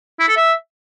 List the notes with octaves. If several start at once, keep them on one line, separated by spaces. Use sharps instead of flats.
E4
A4
E5